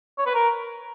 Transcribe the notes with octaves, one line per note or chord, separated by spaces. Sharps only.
C#5
B4
A#4